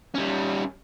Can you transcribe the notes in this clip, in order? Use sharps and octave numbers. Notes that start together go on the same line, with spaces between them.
G3 C#4